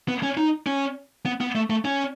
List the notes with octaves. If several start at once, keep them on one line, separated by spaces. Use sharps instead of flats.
B3
C#4
D#4
C#4
B3
B3
A3
A3
C#4